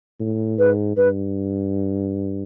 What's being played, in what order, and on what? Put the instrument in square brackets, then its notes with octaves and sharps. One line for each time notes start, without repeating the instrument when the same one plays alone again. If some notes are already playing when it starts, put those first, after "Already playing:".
[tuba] A2
[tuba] G#2 [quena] B4
[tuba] G2 [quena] B4